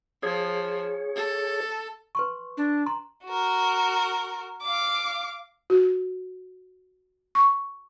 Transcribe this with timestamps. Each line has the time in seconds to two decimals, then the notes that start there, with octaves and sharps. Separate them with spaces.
0.23 F3 G#4 C#5
1.16 A4
2.15 B4 C6 C#6
2.57 D4
2.86 A#5 C6
3.25 F#4 A#4
4.62 F5 D6
5.70 F#4
7.35 C#6